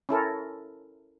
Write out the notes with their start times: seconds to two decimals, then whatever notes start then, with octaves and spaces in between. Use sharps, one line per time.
0.09 C#4 E4 A4 A#4